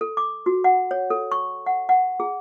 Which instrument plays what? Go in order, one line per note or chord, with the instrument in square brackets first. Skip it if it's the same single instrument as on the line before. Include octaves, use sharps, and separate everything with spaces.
[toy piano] A4
D6
F#4
F#5
C#5
A4
C#6
F#5
F#5
G#4